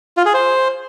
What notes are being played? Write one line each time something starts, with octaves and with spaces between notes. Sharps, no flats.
F4
G#4
C5